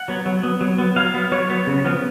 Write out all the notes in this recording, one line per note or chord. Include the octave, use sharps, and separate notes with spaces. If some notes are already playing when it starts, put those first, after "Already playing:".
Already playing: F#5
F#3 B3
F#3
B3
F#3
B3
F#3 F5
B3
F#3 C#5
B3
C#3
F3 B3